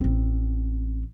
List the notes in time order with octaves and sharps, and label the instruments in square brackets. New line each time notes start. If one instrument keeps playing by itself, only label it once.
[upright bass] A1 C4